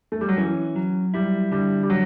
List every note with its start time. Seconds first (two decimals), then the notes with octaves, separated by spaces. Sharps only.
0.12 A3
0.21 G3
0.29 F#3
0.37 E3 C#4
0.76 F#3
1.14 G3 E4
1.51 D3 G3
1.83 G3
1.90 F#3